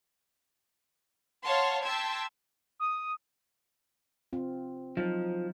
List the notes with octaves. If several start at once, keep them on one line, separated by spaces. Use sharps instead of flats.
C#5 F5 F#5 A5 C6
G5 A5 C6 E6 G#6 B6
D#6
C4 F4
F3 F#3 D#4